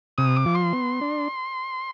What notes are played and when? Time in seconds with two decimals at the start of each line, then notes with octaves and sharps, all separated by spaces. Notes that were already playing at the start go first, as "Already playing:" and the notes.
0.18 C3 D#6
0.36 D6
0.46 F3
0.55 C6
0.73 B3
1.01 D4